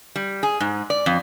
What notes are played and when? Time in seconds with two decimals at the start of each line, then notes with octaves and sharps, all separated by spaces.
0.16 G3
0.43 G#4
0.60 G#2
0.90 D5
1.06 F2